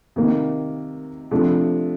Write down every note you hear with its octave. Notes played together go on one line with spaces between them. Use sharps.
C3 D#3 A#3
C3 F3 A3 D4